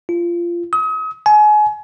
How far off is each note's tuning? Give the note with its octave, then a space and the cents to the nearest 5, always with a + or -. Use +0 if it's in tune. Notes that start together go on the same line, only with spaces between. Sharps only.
F4 -20
D#6 +40
G#5 +30